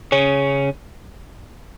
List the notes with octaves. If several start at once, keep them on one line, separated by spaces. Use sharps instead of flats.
C#3 C#4